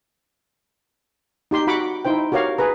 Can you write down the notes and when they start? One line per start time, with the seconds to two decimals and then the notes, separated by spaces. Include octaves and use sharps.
1.51 D#4 G4 C6
1.67 F#4 F#5 B5 D6
2.05 D#4 E4 C5 G5
2.32 F#4 G4 A#4 C#5 F5
2.58 G#4 B4 A#5